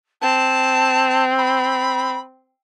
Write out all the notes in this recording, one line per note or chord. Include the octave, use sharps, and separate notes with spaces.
C4 A5
B5